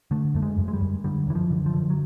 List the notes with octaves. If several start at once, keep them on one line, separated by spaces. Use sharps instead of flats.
D3 A3
F#2 A3
G#3
F#2
G#3
G3
F#2
D3 G3
F#2 E3
F3
D3
F3
D3
F#3